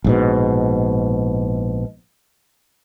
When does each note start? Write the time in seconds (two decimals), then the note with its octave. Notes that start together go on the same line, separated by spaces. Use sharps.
0.04 A#1 G#2 B2